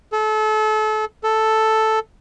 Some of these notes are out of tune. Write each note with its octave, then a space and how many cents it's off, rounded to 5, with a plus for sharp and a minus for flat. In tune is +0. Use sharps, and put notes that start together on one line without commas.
A4 -30
A4 +0